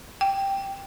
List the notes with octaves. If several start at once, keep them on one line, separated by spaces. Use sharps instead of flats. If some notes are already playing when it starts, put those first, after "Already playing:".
G5